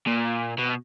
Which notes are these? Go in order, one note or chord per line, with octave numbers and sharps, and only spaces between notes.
A#2
B2